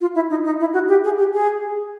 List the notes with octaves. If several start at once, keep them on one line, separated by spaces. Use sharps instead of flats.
F4
E4
D#4
D#4
E4
F#4
G4
G#4
G4
G#4